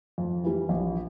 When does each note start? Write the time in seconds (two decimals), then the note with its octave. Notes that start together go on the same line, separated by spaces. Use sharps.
0.18 F2
0.44 E3 G3
0.69 A#1